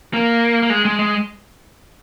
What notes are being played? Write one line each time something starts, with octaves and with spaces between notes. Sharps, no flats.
A#3
A#3
G#3
G#3
G#3